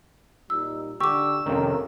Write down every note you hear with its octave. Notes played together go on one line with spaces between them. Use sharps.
A#2 G3 D#4 E6
D3 G4 C#6 D6 E6
F2 C3 D#3 C#4 A#4